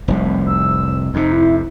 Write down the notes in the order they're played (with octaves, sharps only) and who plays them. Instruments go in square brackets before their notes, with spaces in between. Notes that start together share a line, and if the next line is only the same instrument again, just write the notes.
[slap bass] F1 C2 C3
[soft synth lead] E6
[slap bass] F2 C3 [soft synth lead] D#4
[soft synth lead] E4